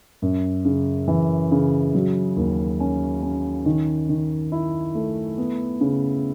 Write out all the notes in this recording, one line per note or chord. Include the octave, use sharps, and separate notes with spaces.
F#2
C#3
E3
C#3
F#3
D#2
C#4
C#4
D#3
D#3
E4
A3
B3
C#3